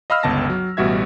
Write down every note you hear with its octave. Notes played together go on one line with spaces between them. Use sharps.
D#5 F5 B5 E6 F6
G1 C#2 B3 A5 A#6
F#3
A1 B2 G3 F#4 E5 G#6